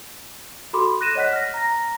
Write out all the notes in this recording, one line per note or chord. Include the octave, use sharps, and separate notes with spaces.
F#4 A4 B5 C6 D6
F#6 A#6 D#7 E7
C#5 D#5 F#5 F#6 B6
F6 A#6
A#5 A#6